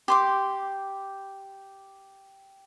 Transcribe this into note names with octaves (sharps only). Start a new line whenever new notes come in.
G4 C6 D6